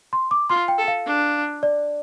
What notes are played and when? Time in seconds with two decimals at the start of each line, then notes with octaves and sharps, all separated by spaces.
0.13 C6
0.31 D6
0.50 F4 C6
0.68 G5
0.78 A4
0.88 F5
1.06 D4
1.63 D5